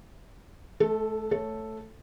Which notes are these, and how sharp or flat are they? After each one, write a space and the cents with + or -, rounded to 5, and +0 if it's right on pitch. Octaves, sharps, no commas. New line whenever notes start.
A3 -35 A4 +0
A3 +0 A4 +0 C#5 +0